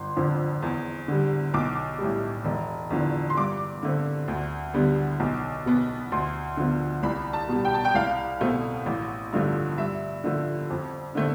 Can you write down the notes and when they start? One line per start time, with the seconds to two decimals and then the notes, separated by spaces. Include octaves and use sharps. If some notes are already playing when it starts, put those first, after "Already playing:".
Already playing: G1 C6
0.16 F2 D3 F3
0.62 E2
1.08 D3 G3
1.54 B1 D6
1.99 A2 G3
2.45 E1
2.90 E2 D3 F3
3.30 C6
3.37 G2 D6
3.83 D3 A3 C4
4.28 D2
4.74 D3 G3 B3
5.20 B1
5.66 B2 B3
6.12 D2 C6
6.57 D3 F3 B3
7.03 C2 B5
7.33 A5
7.49 B2 G3
7.65 G5
7.74 A5
7.85 G5
7.95 C2 F5
8.41 B2 A3 C4
8.86 A1
9.32 G2 D3 F3 A3
9.77 G2 E5
10.24 D3 F3 A3
10.70 F2
11.15 D3 A3 C4